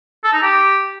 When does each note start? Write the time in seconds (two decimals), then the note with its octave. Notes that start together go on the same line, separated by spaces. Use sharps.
0.24 A4
0.33 D#4
0.42 G4